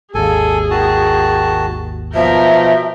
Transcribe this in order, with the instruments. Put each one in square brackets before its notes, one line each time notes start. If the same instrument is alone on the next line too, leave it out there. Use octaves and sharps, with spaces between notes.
[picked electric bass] G#1 D#2 [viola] G#4 [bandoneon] A4 G#5
[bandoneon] D#3 F#4 A5
[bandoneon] B2 F3 [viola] A#4 G5 [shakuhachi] E5